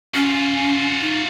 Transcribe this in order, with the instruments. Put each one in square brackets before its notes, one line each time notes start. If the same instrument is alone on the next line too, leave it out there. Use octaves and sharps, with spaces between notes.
[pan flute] C#4 [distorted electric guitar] F4 F#4
[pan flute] D#4